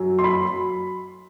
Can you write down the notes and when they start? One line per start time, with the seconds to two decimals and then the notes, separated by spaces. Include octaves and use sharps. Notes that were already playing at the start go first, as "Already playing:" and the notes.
Already playing: F#2 F#3
0.19 C6
0.24 B5